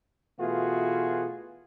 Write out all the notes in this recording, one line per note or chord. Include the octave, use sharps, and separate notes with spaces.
B2 E3 A3 F4 F#4 G#4